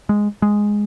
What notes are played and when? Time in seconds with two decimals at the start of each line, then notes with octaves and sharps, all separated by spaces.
0.09 G#3
0.42 G#3